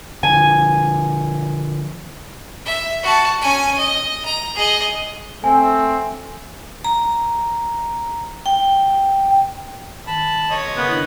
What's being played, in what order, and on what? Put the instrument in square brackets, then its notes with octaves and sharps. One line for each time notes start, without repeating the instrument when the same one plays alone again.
[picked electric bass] D3 F3 [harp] G#5
[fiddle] E5
F#4 A5
C#4 G#5
D#5
A#5
G#4 D#5
[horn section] A3 C4 [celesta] G#5
[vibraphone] A#5
G5
[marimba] D#3 [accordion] A5 B5
[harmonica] C#5 D#5
[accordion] F#2 A#3 C#4 [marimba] C#3 [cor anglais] B3
[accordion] D#3 [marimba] D4 E4